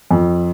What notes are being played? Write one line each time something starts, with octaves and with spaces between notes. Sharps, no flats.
F2